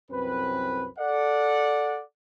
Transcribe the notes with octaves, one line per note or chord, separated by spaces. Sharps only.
C2 F#2 C4 B4
A4 D5 F#5